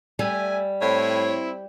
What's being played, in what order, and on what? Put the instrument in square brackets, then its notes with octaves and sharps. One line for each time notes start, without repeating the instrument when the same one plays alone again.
[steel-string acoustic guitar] G3 [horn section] A3 E5 G#5
[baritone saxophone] A2 [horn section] C4 E4 [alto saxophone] C#5